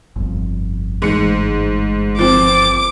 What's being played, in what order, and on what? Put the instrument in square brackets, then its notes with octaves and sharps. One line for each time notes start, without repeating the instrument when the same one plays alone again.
[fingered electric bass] G1 F2
[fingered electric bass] G1 E3 A3 [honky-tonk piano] G#2 C#7
[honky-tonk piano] F3 C4 [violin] D6